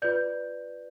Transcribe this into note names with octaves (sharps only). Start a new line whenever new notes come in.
F4 B4 D5 G6